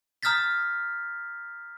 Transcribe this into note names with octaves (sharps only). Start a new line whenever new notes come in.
A#5 D#6 F6 G6 A6 B6